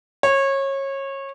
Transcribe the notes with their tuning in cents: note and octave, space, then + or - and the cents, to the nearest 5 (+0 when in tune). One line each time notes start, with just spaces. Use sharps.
C#5 -25